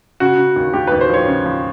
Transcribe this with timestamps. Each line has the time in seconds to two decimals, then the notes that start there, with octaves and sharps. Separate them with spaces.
0.20 C#3 F#4
0.38 C#3
0.56 D#2
0.73 D#2 G4
0.87 D#2 B4
1.01 C5
1.09 F3 C#5
1.27 C#3
1.46 F3